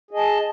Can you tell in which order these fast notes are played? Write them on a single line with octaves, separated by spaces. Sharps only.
G#4 D#5 A5